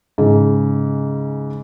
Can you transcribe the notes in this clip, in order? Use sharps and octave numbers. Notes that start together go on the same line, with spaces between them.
G#2 C#3